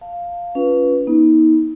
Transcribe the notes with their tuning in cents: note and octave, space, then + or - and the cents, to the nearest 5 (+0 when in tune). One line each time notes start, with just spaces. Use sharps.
F5 +0 A5 +20
C#4 +25 F4 +5 B4 -5
B3 -35 D#4 +30